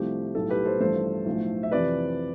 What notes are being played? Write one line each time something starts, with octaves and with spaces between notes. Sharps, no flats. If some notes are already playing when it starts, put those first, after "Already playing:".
Already playing: C2 C3 F3 A3 G4
B1 A2 G3 A4
G4 B4
A4 C5
A1 G2 F3 A3 A4 C5
B1 A2 F3 A3
E5
F2 C3 E3 B4 D5